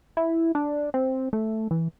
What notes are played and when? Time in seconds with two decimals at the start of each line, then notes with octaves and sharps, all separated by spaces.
0.17 E4
0.55 D4
0.94 C4
1.33 A3
1.71 E3